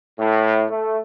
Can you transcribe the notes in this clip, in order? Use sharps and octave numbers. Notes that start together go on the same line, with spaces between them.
A2
A3